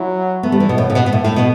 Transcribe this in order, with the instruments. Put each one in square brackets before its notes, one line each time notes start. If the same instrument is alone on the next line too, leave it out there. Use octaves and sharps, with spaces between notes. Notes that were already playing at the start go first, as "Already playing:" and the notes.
Already playing: [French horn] F#3 [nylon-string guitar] E4
[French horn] A3 [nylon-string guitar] B3
[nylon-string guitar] G3
E3
B2
[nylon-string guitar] A2 [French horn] B3
[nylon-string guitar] C#3
B2
B2
[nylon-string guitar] A2 [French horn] A3
[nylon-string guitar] A2
B2